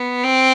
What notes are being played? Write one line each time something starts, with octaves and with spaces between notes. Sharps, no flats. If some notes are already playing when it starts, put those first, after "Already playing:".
Already playing: B3
C4